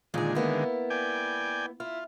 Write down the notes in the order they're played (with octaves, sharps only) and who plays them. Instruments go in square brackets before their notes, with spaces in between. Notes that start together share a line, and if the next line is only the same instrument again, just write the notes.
[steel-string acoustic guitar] A#2 G#4 [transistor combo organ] D3 D#3 G#3
[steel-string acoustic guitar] A#3 B3 E4
[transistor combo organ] D5 G5 G#5
[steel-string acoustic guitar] E4 [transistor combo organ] F4